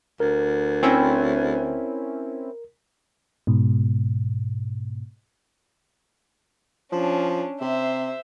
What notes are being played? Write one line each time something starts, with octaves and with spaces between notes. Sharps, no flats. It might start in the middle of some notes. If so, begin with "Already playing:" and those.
D2 A#4
C4 C#4 E4
G#2 B2
F3 C#4 D4
C3 C5 E5